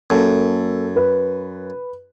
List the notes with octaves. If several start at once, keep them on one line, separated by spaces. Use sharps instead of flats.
F#2 A#3 A4
B4